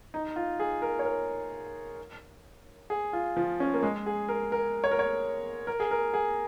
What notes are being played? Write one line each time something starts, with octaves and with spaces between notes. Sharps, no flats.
D#4
F4
G#4
A#4
C#5
A#4
G#4
F4
F3
C#4
A#3
G#3
G#4
A#4
A#4
C#5
A#4
C#5
A#4
G#4
A#4
G#4